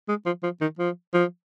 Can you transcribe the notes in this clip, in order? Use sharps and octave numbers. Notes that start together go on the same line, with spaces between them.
G#3
F3
F3
D#3
F3
F3